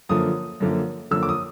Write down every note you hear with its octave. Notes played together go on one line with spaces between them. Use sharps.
F#2 D3 F3 A#3 D#6
F#2 D3 F3 A#3
F#2 D3 F3 A#3 E6
D6
D#6